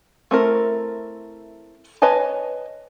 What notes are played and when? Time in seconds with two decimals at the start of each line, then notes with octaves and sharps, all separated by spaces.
0.31 A3 C4 E4 A#4
2.02 B4 C#5 D#5 G#5 A5